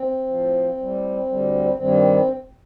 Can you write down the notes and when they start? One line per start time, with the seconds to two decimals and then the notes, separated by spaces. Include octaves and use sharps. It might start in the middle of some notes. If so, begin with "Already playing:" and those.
Already playing: C4
0.27 A2 F3
0.77 A2 G3
1.27 D2 D3 G3
1.76 G2 D#3 G3 C4